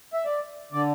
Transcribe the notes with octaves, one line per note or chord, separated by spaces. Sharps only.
E5
D5
D3 D5